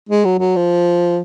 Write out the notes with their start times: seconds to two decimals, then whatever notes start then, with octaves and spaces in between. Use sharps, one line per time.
0.09 G#3
0.25 F#3
0.39 F#3
0.56 F3